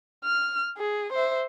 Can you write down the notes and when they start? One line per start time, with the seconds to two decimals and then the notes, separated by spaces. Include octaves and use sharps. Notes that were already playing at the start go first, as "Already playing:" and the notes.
0.24 F6
0.77 G#4
1.13 C5 E5